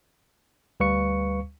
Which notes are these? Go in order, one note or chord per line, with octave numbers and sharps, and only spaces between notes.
D2 G3 B4 F5 C#6 C#7